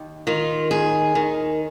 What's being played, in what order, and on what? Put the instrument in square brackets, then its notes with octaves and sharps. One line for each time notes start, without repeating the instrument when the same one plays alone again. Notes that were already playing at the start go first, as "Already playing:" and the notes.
Already playing: [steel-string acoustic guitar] D#2
D#3 F4
D#2 G#4
D#3